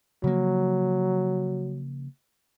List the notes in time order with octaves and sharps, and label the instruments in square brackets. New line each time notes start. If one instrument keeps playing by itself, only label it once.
[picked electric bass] C#3 F3 A#3 [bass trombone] F#3